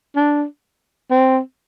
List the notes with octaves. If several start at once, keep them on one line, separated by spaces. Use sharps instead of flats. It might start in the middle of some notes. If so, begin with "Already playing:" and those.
D4
C4